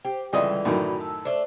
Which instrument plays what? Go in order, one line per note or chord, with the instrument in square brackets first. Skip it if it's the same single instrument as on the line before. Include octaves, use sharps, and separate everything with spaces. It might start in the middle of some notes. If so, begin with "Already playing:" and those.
[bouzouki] G4 [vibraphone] C5
[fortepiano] C#2 D#5 [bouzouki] D3 E3 A3 [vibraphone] G3
[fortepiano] F#2 A2 D#3 [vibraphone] F#4 B5
[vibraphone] A5 E6
[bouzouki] A3 D4 [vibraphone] C5